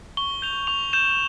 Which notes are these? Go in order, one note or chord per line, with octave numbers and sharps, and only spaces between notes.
C#6 G7
G6 F7
C#6 F7
G6 E7